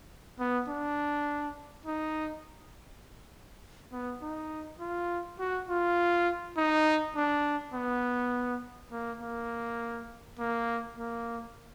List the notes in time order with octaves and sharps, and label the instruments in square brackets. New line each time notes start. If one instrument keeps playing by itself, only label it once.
[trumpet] B3
D4
D#4
B3
D#4
F4
F#4
F4
D#4
D4
B3
A#3
A#3
A#3
A#3